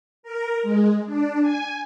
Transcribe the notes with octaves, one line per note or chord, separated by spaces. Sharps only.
A#4
G#3
D4
G#5